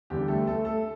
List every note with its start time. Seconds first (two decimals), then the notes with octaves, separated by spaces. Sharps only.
0.10 E2 D3 G3 G4
0.28 A3 A4
0.47 A3 A4
0.65 A3 A4